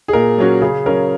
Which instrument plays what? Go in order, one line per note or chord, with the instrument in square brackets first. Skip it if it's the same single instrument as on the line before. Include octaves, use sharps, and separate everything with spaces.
[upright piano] G#4
[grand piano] A#2 [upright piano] A#4
[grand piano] F#3 C#4 F#4
[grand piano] C#3 [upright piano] G#4
[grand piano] F#3 C#4 [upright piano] A#4